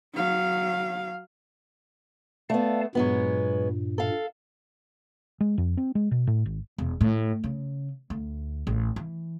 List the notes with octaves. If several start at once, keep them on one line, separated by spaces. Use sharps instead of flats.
F#3 F5
A3 B3 D5 F5 A5
G2 A#2 F#3 G#3 B3
A4 F5
G#3
F2
C4
G#3
B2
A2
G#1
E1
A2
C#3
D2
A1
E3